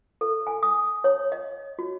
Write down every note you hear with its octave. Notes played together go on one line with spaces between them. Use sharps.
A4
G#5
D#6
C#5
D#5
F#4